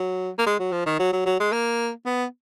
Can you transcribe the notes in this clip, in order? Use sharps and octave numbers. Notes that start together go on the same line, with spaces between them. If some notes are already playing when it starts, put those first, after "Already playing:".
Already playing: F#3
A#3
G#3
F#3
F3
D#3
F#3
F#3
F#3
G#3
A#3
B3